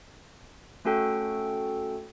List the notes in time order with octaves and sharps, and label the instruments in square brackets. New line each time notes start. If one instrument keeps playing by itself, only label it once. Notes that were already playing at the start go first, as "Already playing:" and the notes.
[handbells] A3 C#4 F#4 A4 G5